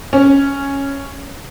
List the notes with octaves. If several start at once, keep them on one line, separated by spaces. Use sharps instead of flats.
C#4